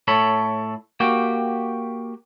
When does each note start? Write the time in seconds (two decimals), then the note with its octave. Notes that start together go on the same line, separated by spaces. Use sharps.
0.08 A2 A4 C#5 B5
1.00 A#3 F#4 G4 G5